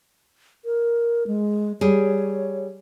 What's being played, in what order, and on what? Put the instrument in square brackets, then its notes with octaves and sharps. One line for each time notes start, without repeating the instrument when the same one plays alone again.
[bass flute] A#4
G#3
[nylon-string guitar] G3 G#4 [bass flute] C#5